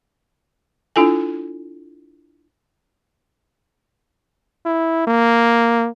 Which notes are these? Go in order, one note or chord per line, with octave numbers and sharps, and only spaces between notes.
D4 E4 F4 A4 G#5
E4
A#3